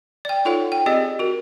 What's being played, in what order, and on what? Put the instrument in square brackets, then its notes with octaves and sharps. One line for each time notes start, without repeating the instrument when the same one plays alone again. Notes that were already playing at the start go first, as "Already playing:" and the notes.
[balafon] D5 G5
D#4 F4 A4 C#5 F#5
G5
C4 G4 G#4 D5 D#5
F#4 A#4